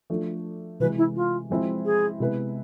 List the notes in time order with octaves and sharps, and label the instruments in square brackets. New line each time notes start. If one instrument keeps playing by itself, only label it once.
[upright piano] F3 A3 D4
[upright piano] C3 E3 G#3 [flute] B4
[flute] E4
F4
[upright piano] F3 G#3 C4 E4
[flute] G#4
[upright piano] C3 G#3 B3 E4 B4